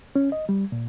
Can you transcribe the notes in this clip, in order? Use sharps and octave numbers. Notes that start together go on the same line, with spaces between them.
C#4
D#5
G3
A#2